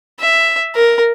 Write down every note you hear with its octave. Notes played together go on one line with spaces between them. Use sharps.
E5
A#4